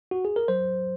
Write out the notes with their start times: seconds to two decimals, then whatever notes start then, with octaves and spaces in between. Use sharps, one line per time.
0.11 F#4
0.25 G#4
0.36 A#4
0.48 F#3 C5